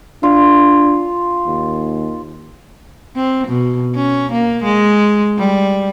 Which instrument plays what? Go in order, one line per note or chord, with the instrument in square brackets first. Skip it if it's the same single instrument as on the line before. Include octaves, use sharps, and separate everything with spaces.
[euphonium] D4 [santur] F4
[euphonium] D#2
[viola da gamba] C4
B2
C#4
A#3
G#3
G3